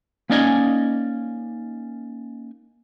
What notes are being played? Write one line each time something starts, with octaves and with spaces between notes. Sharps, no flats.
A#3 C#4 D#4 D5 D#5 G#5